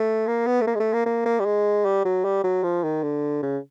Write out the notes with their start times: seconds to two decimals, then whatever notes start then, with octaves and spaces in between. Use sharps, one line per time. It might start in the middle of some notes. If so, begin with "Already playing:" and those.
Already playing: A3
0.27 A#3
0.47 B3
0.61 A3
0.67 A#3
0.75 G#3
0.80 A3
0.93 A#3
1.06 A#3
1.26 A#3
1.40 G3
1.45 G#3
1.85 G3
2.05 F#3
2.24 G3
2.44 F#3
2.63 F3
2.83 D#3
3.03 D3
3.43 C#3